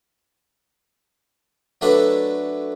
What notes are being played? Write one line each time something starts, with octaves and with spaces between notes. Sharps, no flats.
F#3 A3 D4 A4 B4